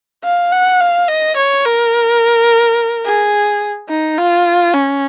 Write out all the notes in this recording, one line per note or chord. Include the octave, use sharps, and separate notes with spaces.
F5
F#5
F5
D#5
C#5
A#4
G#4
D#4
F4
C#4